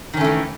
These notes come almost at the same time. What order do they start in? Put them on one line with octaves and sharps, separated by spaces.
D#3 C#4 A3 E3